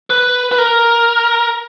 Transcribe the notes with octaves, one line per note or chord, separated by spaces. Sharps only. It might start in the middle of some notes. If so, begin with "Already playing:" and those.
B4
B4
A#4